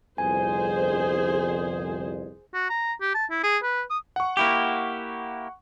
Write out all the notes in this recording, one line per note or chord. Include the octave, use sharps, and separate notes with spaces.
G1 C2 F2 G#4 C5 G#5
F#4
A#5
G4
A5
E4
G#4
B4
D#6
F#5 C#6
A#3 E4 G4